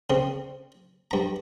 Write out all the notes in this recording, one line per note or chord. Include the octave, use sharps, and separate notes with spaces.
C#3 C4
G2 A#5